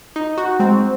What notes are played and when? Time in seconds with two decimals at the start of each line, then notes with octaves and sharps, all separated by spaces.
0.16 D#4
0.38 F#4
0.60 G#3 C4